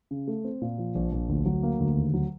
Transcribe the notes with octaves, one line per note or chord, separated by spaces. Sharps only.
C#3
A3
C4
A#2
F3
A#1
A#1
D2
F#3
A#3
D2
D#2
F#3